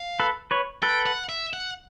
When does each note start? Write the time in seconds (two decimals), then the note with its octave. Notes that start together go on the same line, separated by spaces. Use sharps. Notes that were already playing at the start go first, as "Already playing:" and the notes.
Already playing: F5
0.20 A4 B4
0.51 B4 C#5
0.82 A4 B4 G5
1.06 F#5
1.29 E5
1.53 F#5